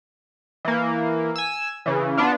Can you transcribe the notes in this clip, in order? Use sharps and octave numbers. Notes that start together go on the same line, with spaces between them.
E3 A#3
G#5 E6
C#3 E3
B3 D4 F4